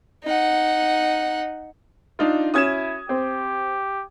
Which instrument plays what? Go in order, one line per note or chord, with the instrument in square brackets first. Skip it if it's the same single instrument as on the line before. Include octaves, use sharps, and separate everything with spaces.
[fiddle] D#4 F#5
[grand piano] D4 D#4 F4
[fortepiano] C#4 F#4 [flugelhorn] E4 [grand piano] D#6 G#6 E7
[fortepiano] C4 [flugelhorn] G4